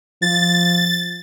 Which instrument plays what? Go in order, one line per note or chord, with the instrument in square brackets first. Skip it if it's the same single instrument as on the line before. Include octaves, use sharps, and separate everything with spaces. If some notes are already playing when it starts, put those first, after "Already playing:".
[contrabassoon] F3 [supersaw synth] A6